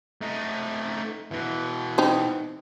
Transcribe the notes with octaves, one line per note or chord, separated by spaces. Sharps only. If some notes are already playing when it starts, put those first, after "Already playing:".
A3 D#4
B2 E3
C4 D#4